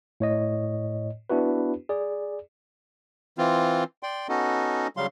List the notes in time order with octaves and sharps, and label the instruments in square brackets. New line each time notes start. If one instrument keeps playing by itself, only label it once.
[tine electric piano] A2 C#5 D#5
B3 D4 E4 F#4 B4
G#4 D5
[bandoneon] E3 C4 F4
D5 G5 C6
B3 C#4 D#4 F#4 A4 D#5
C#3 F#3 G3 F5 C6